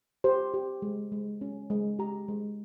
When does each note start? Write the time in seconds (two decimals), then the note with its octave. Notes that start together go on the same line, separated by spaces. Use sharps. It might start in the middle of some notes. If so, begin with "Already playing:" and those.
0.24 G4 C5
0.54 G4
0.82 G#3
1.12 G#3
1.41 C#4
1.70 G#3
1.99 G4 A#5
2.28 G#3